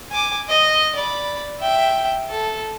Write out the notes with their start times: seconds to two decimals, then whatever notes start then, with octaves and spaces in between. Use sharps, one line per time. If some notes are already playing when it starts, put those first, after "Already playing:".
0.11 G#5 D6
0.49 D#5
0.95 D5 B5
1.60 E5 G5
2.29 A4